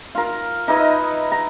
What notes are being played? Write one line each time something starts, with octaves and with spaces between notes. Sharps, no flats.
F4 A#4
D#4 E4 B4 D#5
A#5